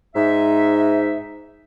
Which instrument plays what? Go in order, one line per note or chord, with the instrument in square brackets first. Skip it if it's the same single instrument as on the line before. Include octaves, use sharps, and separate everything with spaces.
[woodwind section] G#2 D#4 E5